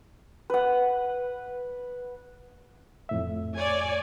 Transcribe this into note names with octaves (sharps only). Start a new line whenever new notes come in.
B4 F#5
F2 A2 E5
C#5 D5 G#5